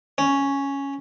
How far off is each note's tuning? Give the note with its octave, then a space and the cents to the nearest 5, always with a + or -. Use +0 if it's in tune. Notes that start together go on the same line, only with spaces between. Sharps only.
C#4 +0